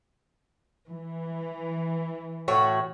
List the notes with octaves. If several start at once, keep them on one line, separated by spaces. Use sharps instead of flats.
E3
A2 F#4 C#5